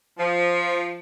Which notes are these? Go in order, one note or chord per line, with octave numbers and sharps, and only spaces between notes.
F3